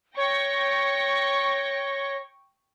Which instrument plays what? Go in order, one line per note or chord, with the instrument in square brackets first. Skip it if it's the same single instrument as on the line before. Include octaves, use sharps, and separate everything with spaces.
[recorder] C#5 [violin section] G5 C#6 A#6